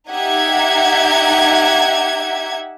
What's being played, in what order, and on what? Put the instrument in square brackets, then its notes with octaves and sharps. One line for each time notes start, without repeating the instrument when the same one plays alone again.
[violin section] D#4 G4 E5 F#5 G#6